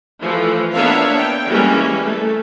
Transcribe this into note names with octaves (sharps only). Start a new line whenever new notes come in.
E3 F3 A3
A#3 B3 D4 C#5 E5 F5
G5
E3 G3 G#3 A#3 C#4
A3